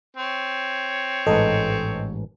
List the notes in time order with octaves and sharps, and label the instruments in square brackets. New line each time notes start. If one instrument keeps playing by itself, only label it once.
[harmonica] C4 C#5
[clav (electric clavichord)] A1 G#2 B4 [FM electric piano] A4 D#5